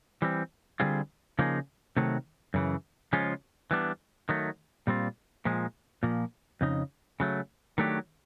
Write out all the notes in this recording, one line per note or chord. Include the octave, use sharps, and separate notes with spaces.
E3 G3 C4
D3 G3 C4 F4 G#4
C#3 F3 A#3 D#4 G#4
C3 D#3 F#3 A3
F#2 C#3 E3
C#3 F3 G#3 C#4 F4
E3 G3 B3 D4
D#3 F#3 A3
A#2 G3 C4 F4
A#2 F3 G#3
A#2 F3 A#3
F2 C#3 D#4
C#3 F#3 A3
D#3 F#3 A3 D4 G4